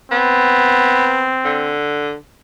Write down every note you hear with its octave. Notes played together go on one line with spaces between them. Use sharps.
B3 C4
D3